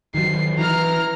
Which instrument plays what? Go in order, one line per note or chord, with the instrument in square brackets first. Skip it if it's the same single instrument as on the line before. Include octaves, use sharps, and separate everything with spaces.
[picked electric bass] D#3 F#3 [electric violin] C7
[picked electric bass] E3 [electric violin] A#5 F6